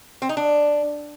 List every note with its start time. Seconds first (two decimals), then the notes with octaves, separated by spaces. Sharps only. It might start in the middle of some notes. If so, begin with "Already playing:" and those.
0.22 C4
0.29 D#4
0.37 D4